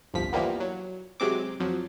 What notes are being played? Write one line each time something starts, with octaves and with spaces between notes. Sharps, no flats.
G1 C2 F2 F3 B6
E3 F3 G3 A#3 B3
F#3
C3 F#3 G#3 C4 D6
F2 F3 F#3